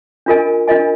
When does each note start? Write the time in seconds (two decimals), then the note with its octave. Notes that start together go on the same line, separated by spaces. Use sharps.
0.26 D4 F4 A#4 D#5 G#5
0.68 D4 F4 A#4 D#5 G#5